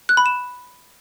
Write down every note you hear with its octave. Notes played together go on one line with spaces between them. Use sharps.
F#6
B5
E7